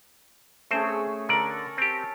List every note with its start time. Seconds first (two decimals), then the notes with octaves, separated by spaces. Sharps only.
0.71 A3 C4 C#4 G#4 C5
1.29 D3 A4 A#4 D5
1.78 C4 G4